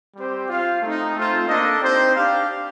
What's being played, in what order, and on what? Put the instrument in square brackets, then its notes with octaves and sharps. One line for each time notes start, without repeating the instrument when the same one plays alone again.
[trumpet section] G3 C4 G4 C5
F4 C5 F5
A3 C4 D#4
A3 C4 F4 C5
A#3 D4 A4 D#5
C4 D#4 G4 C5
D4 G4 D5 F5